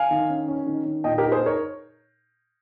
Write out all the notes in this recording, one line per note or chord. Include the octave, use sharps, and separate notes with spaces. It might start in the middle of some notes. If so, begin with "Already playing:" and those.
Already playing: F5 G#5
D#3
C#4
C#4
D#3
D#3
A#2 D#5 G5
G4 A#4
D#4
G#4 C5
D#4 A#4 C#5